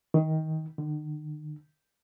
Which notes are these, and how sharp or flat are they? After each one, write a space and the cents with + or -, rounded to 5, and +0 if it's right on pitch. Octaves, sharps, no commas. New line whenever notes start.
D#3 +20
D#3 -45